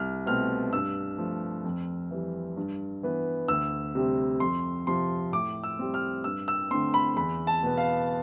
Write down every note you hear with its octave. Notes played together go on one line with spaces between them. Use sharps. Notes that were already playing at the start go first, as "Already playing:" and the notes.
Already playing: C2 F6
B2 A3 C4 F6
G2 E6
F3 A3
F2
E3 G3
G2
E3 B3
D2 E6
C3 G3 C4
F2 C6
C3 F3 C6
A2 D6
E6
G3 C4
F6
G2 E6
E6
D3 A3 C4 C6
B5
E2 B5
A5
B2 B3
F5